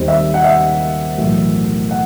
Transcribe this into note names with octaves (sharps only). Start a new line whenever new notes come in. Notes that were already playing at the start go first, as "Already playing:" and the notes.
Already playing: D#2 D#3 G3 C4 C5
E5
F#5
E5
B1 A2 E3
F#5